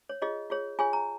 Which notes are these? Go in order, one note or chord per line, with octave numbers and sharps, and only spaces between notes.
C#5
F4 G#4 C#5 D#5
F4 G#4 C#5
F4 G#4 C#5 G#5
A#5